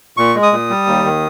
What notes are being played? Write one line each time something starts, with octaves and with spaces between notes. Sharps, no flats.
A#2 C#6
G#3
D#6
A#2
G3
D#2
D#3